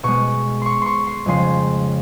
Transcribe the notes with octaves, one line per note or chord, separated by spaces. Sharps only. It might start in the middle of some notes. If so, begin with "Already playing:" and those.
B2 G#3 C#6
C6 C#6
C6 C#6
C6
F2 C#3 F3 G#3 C6